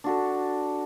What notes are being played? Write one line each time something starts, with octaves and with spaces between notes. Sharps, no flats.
D4 F#4 A4